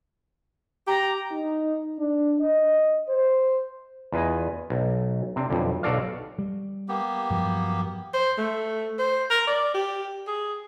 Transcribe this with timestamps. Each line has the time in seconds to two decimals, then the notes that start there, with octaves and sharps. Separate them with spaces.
0.88 G4 A#5
1.32 D#4
1.98 D4
2.39 D#5
3.08 C5
4.12 E2 F4 B4 D#5 G#5
4.70 B1
5.36 C3 C4 D4
5.50 B1 F2 D3
5.83 B1 F#4 A4 D5 F5
6.39 G3
6.88 A#3 B3 G4
7.31 G2 F3 F#3
8.14 C5
8.38 A3
8.99 C5
9.30 A#4
9.47 D5
9.75 G4
10.27 G#4